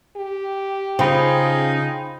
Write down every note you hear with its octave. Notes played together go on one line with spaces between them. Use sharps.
G4
C#3 D#4 F4 G#4 C5 G5 B5